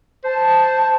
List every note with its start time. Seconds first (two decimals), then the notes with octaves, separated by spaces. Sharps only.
0.24 C5 A5